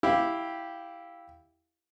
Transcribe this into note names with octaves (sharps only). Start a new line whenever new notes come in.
E4 G4 F5